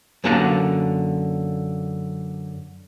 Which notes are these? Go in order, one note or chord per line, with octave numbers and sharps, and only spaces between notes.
F#2 D3 A#3 F#5 A5 A#5